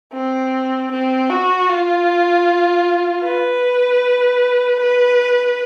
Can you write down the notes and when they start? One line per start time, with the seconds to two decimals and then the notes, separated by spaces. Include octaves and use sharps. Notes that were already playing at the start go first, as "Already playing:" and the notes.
0.13 C4
0.92 C4
1.30 F#4
1.69 F4
3.24 B4
4.80 B4